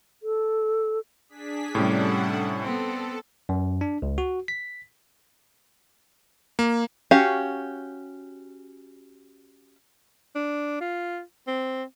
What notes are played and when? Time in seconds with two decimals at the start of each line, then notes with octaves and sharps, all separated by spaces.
0.23 A4
1.29 D4 G#4 B6
1.75 A2 C3 G3 C#4 D4 A4 F#5
2.62 B3 C4 A4
3.49 F#2
3.81 D4
4.02 C#2
4.18 F#4
4.48 B6
6.59 A#3
7.11 C#4 F#4 G4 F5
10.35 D4
10.81 F4
11.47 C4